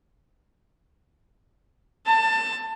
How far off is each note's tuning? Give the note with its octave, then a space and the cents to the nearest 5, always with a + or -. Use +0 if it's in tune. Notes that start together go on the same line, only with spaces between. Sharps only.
A5 +20